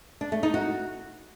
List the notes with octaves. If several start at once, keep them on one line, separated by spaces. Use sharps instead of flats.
D4
A3
D#4
F#4